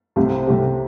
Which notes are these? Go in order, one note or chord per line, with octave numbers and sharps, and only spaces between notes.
C2 C3 A3 C4 G4
C2 C3 A3 C4 G4